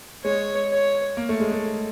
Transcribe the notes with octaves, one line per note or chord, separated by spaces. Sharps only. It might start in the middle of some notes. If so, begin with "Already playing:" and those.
G#3 C#5
C#5
A#3
A3
G#3
A3